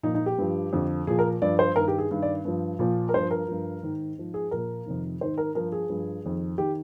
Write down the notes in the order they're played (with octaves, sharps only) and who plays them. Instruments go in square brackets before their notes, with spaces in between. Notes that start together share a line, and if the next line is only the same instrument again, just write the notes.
[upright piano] A#2 F3 D#4
D#4
G4
G2 F3
F2 D3 F3
A#2 F3 G#4
A#4
G2 F3 D5
C5
G2 D#3 A#4
G4
G#4
G2 D#3
D5
G2 F3
A#2 F3
A#4
G2 F3 C5
A#4
G2 F3
G#2 D#3
G#2 F3
G#4
A#2 F3 A#4
F2 C3 D#3
G#2 D#3 C5
A#4
G2 F3 A#4
G#4
G2 F3
F2 D#3
D#3 G4